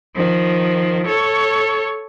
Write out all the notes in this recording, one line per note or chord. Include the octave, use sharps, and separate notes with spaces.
D#3 F3
A4 C#5